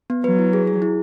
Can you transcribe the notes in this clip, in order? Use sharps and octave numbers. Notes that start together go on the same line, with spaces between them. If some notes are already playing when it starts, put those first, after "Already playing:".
B3
F#3 B4
E4
G#4
G#4
E4